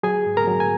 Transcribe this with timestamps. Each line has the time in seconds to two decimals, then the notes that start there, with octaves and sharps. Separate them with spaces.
0.03 F#3 G#4 G#5
0.26 G#2
0.37 A#4 A#5
0.47 F#3
0.60 G#5